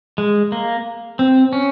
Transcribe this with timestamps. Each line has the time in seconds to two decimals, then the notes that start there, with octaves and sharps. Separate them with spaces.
0.18 G#3
0.52 A#3
1.19 C4
1.53 C#4